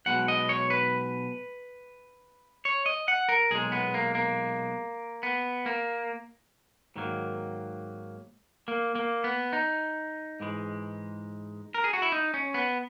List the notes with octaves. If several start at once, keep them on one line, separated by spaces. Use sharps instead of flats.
B1 B2 G#3 F#5
D#5
C#5
B4
C#5
D#5
F#5
A#4
B1 A#2 G#3 G#4
B3
A#3
A#3
B3
A#3
G#2 D#3 F#3 A#3
A#3
A#3
B3
D#4
G#2 E3 G#3
A#4
G#4
F#4
E4
D#4
C#4
B3